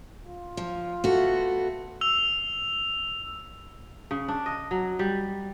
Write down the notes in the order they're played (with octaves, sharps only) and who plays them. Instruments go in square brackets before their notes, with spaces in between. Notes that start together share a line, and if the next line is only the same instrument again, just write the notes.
[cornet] F4
[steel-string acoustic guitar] F3
A3 B3 F#4
[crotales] E6 F7
[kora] C#3
D4
D#5
F#3
G3